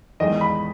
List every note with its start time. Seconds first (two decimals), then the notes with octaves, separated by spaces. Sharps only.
0.20 E2 D#3 G#3 D#5
0.41 B5